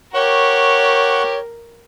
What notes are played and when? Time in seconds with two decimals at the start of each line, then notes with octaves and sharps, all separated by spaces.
0.14 G4 A#4 C#5 F#5 C#6